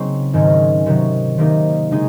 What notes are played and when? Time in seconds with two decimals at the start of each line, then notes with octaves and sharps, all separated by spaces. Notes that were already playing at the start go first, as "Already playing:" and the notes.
Already playing: C#3 F#3 A#3 C4 D#4
0.33 G#2 D#3 G#3 C#4
0.86 C3 D#3 F#3
1.38 C3 D#3 A#3 D#4 A#4
1.91 C#3 G#3 D#4 G#4